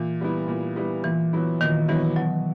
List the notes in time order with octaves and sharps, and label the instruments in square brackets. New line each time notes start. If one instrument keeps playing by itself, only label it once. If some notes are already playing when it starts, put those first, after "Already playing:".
Already playing: [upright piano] A#2 [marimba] E3
[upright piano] G3 B3 E4
A#2
G3 B3 E4
[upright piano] A#2 [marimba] E3
[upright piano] F#3 B3 E4
[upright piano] A#2 [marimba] D#3
[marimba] E3 [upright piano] F#3 B3 E4
[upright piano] B2 [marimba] F#3